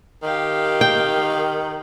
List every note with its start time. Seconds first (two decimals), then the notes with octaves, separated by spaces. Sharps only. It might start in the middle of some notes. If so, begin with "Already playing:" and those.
0.23 D#3 G4 F5
0.81 G5